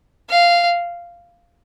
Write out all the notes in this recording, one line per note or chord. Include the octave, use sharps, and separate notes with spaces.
F5